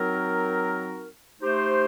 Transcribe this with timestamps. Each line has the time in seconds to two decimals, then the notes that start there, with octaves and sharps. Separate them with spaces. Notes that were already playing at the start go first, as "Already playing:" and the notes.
Already playing: F#3 C4 D#4 F#4 A#4
1.40 A3 D#4 G4 C5